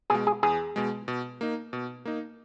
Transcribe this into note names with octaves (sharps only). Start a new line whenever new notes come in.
B2 G#3 G#4
G#4
E2 G#4
B2 G#3
B2
A#3 D#4
B2
A#3 D#4